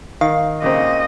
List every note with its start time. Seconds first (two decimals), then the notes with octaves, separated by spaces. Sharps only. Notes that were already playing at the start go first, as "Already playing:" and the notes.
0.21 D#3 F5
0.62 A#2 C#3 C4 D#5